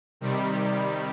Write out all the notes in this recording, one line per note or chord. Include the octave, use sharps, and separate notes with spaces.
C3 D#3 G3